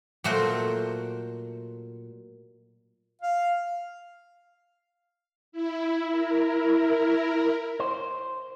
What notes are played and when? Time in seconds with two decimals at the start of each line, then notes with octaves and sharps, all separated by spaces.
0.24 A#2 F#3 A3 F#4 A#4 C5
3.22 F5
5.52 E4
6.06 E4 A#4
7.80 C5